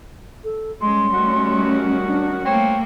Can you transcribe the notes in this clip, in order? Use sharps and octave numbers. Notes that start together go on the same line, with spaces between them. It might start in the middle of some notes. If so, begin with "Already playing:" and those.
A4
G3 G#3 C#4 C6
D#3 A3 F#4
D4
A3 A#3 F#4 C5 C#5 G5